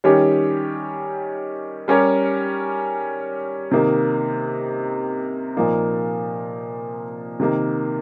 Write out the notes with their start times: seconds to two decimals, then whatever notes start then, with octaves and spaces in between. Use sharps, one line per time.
0.04 D#3 G3 C#4 G4 C#5
1.88 G3 C#4 G4 A#4 C#5
3.71 C3 D#3 A#3 D#4
5.57 A#2 F3 A#3 D#4
7.40 C3 D#3 A#3